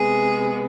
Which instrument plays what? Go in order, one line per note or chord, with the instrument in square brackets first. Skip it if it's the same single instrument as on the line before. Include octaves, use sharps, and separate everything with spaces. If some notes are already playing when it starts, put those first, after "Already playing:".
Already playing: [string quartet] C3 G#3 B3 G#4